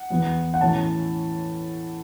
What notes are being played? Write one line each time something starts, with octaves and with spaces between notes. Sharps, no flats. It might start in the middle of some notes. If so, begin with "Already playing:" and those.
Already playing: F#5
E2 E3 B3
F#5
A2 E3 C#4 A5